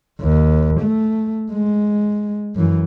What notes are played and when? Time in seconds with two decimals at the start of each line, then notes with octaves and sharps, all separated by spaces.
0.21 D#2
0.81 A3
1.52 G#3
2.56 F#2 E3